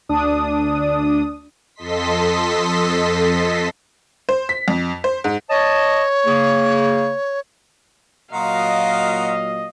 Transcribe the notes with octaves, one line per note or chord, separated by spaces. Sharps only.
D2 D4 D#6
F2 A4 D#5 C6 B6
C5
B6
F2
C5
G#2
C#5 D#5 A5
C#3 A#3 G#4
A#2 F#3 F4 F#4 A#4 D#5 F5